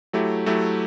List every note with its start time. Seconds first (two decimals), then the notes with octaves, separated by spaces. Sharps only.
0.13 F#3 A3 E4 G4
0.46 F#3 A3 E4 G4